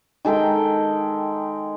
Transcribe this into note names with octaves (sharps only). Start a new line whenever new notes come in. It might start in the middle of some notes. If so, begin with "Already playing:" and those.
D#3 G#3 A4 G5